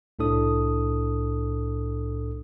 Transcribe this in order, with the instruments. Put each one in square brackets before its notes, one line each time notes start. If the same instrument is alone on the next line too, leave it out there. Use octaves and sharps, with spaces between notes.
[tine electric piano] C2 A2 D4 A4 D#6